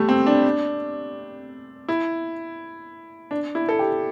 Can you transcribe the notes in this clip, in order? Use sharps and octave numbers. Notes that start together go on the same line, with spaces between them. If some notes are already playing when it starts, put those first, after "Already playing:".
Already playing: G3 A3
C4
D4
E4
D4
E4
A4
G4